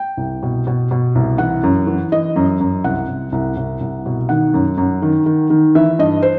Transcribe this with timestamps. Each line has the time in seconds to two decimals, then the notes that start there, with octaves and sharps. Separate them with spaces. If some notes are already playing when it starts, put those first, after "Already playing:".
Already playing: G5
0.17 C2
0.43 B2
0.67 B2
0.91 B2
1.15 C2
1.38 E3 F#5
1.63 F#2
1.87 E3
2.12 E3 D#5
2.36 F#2
2.60 F#2
2.84 C2 F#5
3.08 C2
3.32 C2
3.57 C2
3.80 C2
4.06 B2
4.29 D#3 F#5
4.54 F#2
4.77 F#2
5.02 D#3
5.26 D#3
5.50 D#3
5.75 E3 E5
5.99 G2 D#5
6.23 C5